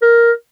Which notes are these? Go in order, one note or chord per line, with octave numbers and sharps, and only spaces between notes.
A#4